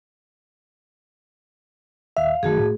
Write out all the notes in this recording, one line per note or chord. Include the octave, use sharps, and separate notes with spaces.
D#2 E5 F5
F#2 D#3 A3 F#4 G#4
A2